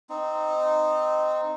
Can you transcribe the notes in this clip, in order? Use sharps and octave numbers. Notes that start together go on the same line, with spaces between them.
C4 D#4